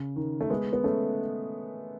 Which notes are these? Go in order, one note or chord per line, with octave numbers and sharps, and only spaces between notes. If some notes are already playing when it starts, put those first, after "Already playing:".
Already playing: C#3
D#3
A3
G#3 B3
B3
A3 C#4